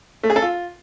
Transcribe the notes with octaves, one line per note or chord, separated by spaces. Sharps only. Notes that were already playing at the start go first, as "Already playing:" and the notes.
A3
G#4
A4
F4